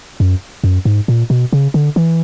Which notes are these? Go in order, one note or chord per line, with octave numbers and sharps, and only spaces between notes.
F#2
F#2
G#2
A#2
B2
C#3
D3
E3